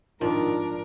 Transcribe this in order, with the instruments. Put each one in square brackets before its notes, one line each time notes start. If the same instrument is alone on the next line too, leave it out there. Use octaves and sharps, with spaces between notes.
[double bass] G#2 D4 [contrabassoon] D#3 [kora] F3 [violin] A#4